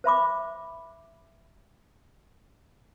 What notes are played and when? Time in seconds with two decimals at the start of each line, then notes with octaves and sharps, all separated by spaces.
0.04 C5 E5 B5 D6